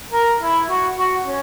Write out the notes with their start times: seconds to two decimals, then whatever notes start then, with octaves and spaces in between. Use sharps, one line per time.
0.12 A#4
0.41 E4
0.68 F#4
0.96 F#4
1.24 C#4